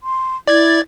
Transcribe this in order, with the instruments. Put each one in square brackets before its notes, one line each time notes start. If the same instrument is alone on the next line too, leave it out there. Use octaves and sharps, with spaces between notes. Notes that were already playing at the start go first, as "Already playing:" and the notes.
[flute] C6
[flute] E4 [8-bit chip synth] D5 G#6 A6